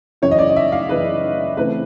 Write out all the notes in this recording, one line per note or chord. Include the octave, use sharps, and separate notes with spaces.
F#2 C#3 E3 C#5
D#5
D5
D#5
E5
F5
F#2 C#3 E3 B4
C#3 E3 A3 C4 B4